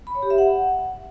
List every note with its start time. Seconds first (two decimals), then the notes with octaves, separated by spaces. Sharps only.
0.07 B5
0.15 C#5
0.23 G4
0.30 E5
0.38 F#5